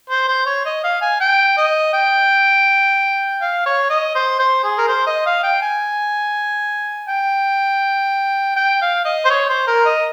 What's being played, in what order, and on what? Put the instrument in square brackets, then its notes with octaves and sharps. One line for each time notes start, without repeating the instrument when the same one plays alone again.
[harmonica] C5
C5
C#5
D#5
F5
G#5
G5
D#5
G5
F5
C#5
D#5
C5
C5
G#4
A#4
C5
D#5
F5
G5
G#5
G5
G5
F5
D#5
C5
C#5
C5
A#4
D#5